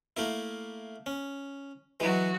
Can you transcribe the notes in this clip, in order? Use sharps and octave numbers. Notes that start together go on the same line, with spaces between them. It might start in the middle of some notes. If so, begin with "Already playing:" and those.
A3 A#3 E4
C#4
E3 F#3 G#3 F#4